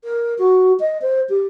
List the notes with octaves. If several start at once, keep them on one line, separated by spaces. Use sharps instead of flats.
A#4
F#4
D#5
C5
G4